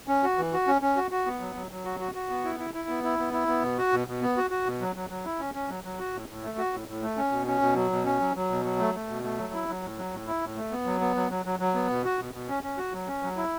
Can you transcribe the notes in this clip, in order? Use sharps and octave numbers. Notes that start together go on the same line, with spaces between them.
C#4
F#4
E3
F#4
C#4
C#4
F#4
F#4
B3
F#3
F#3
F#3
F#4
F#4
F#4
B3
E4
E4
E4
B3
E4
B3
E4
B3
B2
F#4
B2
B2
B3
F#4
F#4
B2
F#3
F#3
F#3
E4
C#4
C#4
F#3
F#3
F#4
A2
A2
A3
F#4
A2
A2
A3
C#4
B2
C#4
B2
F#3
B2
C#4
F#3
F#3
B2
F#3
A3
A3
B2
A3
F#3
E4
F#3
A2
F#3
A2
E4
A2
A3
B3
F#3
B3
F#3
F#3
F#3
F#3
B3
B2
F#4
B2
B2
C#4
C#4
F#4
F#3
C#4
F#3
E4